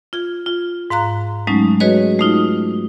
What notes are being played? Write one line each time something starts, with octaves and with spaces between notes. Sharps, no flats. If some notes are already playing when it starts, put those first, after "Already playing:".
F4 G#6
F4
G#2 F5 A#5 F#6
F#3 G#3 A3 C#4 D#4
F#4 G#4 B4 C#5 D#5
A3 D#4 F4